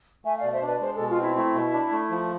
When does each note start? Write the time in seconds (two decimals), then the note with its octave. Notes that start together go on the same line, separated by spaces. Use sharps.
0.24 A3 E5 G#5
0.38 B2 D5 F5
0.52 C5 E5
0.62 D4 B4 D5
0.80 G#3 C5
0.94 B2 A4
1.08 F4
1.18 C4 E4
1.35 A3 E4
1.54 B2
1.73 D4
1.92 A3
2.10 F3